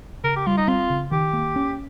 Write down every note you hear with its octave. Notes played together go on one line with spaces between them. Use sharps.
C#3 A#4
G4
G3 F4
D#4
C4 F4
C#3
D#3 G4
A#3
C#4